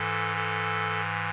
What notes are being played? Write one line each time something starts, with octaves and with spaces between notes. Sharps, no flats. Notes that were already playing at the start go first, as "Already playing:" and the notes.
Already playing: G#2 E3 A4
A4